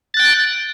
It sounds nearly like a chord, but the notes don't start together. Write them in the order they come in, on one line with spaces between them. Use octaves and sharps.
A6 F#6 G5